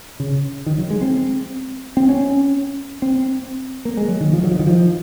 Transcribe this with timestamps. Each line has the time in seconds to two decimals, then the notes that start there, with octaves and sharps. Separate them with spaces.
0.20 C#3
0.66 D#3
0.78 F#3
0.90 G#3
1.01 C4
1.97 C4
2.09 C#4
3.02 C4
3.85 A#3
3.97 G#3
4.08 F#3
4.21 D#3
4.33 F3
4.44 F#3
4.51 F3
4.59 D#3
4.67 F3